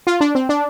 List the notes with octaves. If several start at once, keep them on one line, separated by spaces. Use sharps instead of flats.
F4
D4
C4
D4